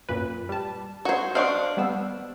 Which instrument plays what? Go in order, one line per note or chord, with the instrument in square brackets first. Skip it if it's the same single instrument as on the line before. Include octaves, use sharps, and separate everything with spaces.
[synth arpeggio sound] F#2 A#2 B4
G3 A5
[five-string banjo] F#4 C5 [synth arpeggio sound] C#6 G#6
[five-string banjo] D4 C5 F5 [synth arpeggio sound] D#5 F#5 C#6
[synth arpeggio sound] G3 B3 E6